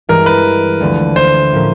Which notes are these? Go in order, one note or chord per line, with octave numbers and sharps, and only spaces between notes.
G2 E3 G#3 A#4
B4
D2 D3 F3 A3
C5
A2 F3 A#3 C#4